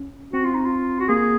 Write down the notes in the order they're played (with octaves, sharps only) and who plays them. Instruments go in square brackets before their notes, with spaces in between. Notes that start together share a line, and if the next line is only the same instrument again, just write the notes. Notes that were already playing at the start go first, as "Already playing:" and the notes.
Already playing: [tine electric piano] C#4
[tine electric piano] C4 [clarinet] F#4
[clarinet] F4
D#4
F4
F#4
[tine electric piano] A#3 [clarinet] G#4